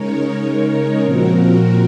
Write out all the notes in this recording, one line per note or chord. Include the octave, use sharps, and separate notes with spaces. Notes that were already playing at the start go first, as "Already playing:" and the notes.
Already playing: C#3 G#3 D#4 A#4 C#5
A#2 F3 C4 F#4 A#4